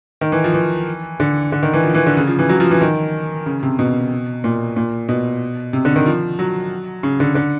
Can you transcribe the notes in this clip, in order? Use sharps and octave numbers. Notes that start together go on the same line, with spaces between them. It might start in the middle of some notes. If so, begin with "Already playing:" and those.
D#3
E3
F3
E3
D3
D3
D#3
E3
F3
E3
D3
C#3
F3
E3
F#3
F3
E3
D#3
C#3
C3
B2
A#2
A#2
B2
C3
D3
D#3
F3
F#3
C#3
D3
D3